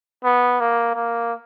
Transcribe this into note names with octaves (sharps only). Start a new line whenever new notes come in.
B3
A#3
A#3